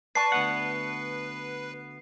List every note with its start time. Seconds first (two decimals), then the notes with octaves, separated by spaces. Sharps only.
0.15 B4 D5 A5 C#6 C7
0.32 D2 B3 F#5